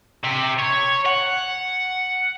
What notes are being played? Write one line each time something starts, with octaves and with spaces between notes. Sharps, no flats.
C3
C#5
F#5